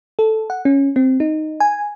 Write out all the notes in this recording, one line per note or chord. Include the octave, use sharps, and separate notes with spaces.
A4
F#5
C#4
C4
D#4
G#5